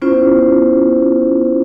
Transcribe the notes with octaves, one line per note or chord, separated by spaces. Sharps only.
B3 C#4 E4 F4 C5